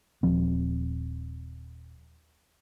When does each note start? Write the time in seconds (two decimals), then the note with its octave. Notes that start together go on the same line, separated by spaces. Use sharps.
0.23 D#1 F3 C4